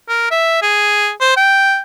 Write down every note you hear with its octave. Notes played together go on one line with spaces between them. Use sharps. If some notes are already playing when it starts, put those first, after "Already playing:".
A#4
E5
G#4
C5
G5